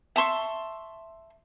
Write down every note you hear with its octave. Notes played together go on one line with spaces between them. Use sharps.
E5 A5 C6 C#6